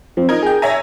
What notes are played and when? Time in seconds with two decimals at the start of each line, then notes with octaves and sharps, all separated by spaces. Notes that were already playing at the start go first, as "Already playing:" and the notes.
0.17 F3 C4
0.29 D#4 A#4 G#6
0.43 G#4 G5
0.62 C#5 E5 G#5 A#5 A#6